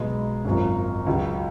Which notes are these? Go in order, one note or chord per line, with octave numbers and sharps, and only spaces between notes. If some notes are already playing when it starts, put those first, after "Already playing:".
Already playing: B1 B2 G#3
G#1 F#2 F3
C#2 C#3 F#3